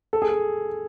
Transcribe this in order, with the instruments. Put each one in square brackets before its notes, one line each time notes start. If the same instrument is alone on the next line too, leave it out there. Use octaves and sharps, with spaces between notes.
[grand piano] A4
G#4
A4